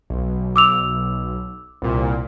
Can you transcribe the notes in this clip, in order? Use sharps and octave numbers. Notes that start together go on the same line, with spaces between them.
B1
D6 E6 F7
C2 A#2